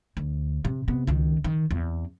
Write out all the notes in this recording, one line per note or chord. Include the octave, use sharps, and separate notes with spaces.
D2
C3
C3 B3
C#2 D#3
D#3
E2 C4